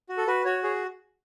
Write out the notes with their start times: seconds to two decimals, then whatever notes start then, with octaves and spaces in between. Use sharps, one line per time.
0.09 F#4
0.17 A4
0.27 F#4 B4
0.45 F#4 C#5
0.63 G#4 C#5